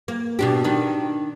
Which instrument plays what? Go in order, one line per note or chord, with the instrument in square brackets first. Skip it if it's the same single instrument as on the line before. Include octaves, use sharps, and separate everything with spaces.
[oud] A#3
B2 D4 G4
D#3 D4